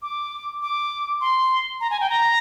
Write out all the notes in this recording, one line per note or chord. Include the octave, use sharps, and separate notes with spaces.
D6
D6
C6
A#5
G#5
G5
A#5